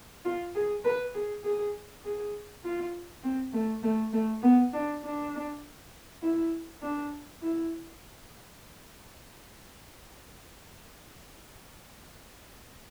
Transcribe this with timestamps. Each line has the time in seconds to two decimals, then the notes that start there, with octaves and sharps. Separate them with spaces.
0.25 F4
0.55 G#4
0.85 B4
1.14 G#4
1.44 G#4
2.05 G#4
2.65 F4
3.23 C4
3.53 A3
3.83 A3
4.13 A3
4.43 B3
4.73 D4
5.03 D4
6.22 E4
6.82 D4
7.42 E4